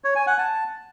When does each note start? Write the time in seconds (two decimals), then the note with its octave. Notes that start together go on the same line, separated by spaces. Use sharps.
0.04 C#5
0.16 G#5
0.27 F#5
0.38 A5